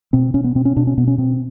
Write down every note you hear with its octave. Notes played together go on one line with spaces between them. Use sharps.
B2 C4
B2 C#4
B3
B2 C4
C#4
B2 D4
C#4
B2 B3
C#4
B2 C4